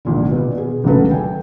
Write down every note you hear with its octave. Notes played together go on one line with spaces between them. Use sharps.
G#1 A#2 D3
B2 B3
G#4
G#1 D2 C#3 F#3 A4 B4
G5 G#5